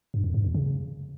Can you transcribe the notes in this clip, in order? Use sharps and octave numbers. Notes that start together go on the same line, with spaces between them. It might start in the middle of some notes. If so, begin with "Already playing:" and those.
G2
F2
G#2
E2
C#3